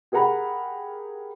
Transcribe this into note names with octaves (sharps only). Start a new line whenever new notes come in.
G4 G#4 A#4 F#5 A#5 B5